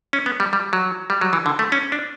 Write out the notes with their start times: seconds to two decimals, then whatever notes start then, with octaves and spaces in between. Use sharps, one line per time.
0.13 C#4
0.26 B3
0.40 G3
0.53 G3
0.73 F#3
1.10 G3
1.21 F#3
1.33 E3
1.46 D3
1.59 A3
1.72 C#4
1.92 D4